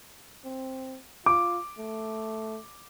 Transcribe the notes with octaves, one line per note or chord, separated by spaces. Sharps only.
C4
F4 D6
A3